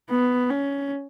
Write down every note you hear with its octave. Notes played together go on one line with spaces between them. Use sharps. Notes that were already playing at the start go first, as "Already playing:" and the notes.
B3
C#4